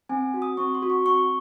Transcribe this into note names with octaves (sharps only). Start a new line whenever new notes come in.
C4 G#5
F#4
D#6
C4 C#6
C6
F#4
C#6
C4 C#6